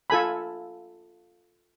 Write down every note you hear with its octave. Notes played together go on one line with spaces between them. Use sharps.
F4 A4 G#5 B5